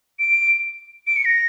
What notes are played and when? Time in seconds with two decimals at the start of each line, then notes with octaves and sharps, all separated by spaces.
0.19 D7
1.07 D7
1.16 C#7
1.25 A#6